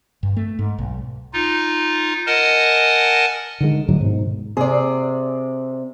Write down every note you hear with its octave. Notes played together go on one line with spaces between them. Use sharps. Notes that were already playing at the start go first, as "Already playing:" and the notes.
G2
A3
G#2
B1
D#4 F4
A#4 D#5 F#5 G#5 A5
D3 D#3 G#3
A2 D3 F#3 G#3
G#2 B2 D#3
C3 G#4 D5